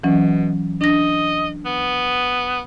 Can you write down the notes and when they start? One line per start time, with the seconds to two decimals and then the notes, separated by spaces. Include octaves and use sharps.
0.03 B2 E3 F#3 C#4
0.81 D4 D#5 A#6
1.65 B3